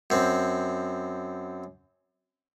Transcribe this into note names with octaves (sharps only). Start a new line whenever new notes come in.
F#2 C4